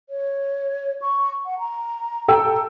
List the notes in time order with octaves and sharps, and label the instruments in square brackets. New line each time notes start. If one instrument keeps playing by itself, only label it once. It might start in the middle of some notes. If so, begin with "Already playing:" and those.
[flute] C#5
C#6
F#5
A#5
[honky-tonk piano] A4 G5 E6